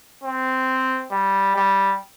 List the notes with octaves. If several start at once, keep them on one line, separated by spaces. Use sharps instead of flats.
C4
G3
G3